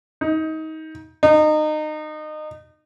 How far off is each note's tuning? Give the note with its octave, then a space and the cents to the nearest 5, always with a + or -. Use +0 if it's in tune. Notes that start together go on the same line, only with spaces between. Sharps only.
D#4 +25
D#4 -25